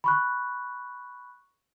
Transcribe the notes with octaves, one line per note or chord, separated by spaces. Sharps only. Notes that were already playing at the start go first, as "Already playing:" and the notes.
B5 C#6 F#6